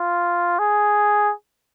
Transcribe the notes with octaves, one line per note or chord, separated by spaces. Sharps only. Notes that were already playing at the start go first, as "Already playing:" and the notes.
Already playing: F4
G#4